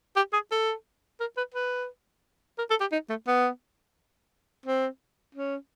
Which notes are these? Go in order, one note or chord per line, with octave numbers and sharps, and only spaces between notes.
G4
G#4
A4
A#4
B4
B4
A#4
A4
G4
D#4
A3
B3
C4
C#4